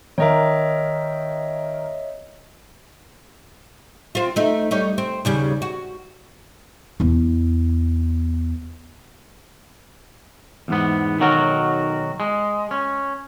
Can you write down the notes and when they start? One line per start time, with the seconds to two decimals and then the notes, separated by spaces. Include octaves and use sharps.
0.18 D#3 A#4 C#5 D#5 E5
4.15 C4 F4
4.36 A3 D#4
4.71 G3 D#4 C#5
4.98 C4
5.25 D#2 C#3 G3
5.62 F#4
7.00 E2 B3
10.68 E2 G#2 B3
11.20 B1 D#3 F#3 F#4 A#4
12.20 G#3
12.71 C#4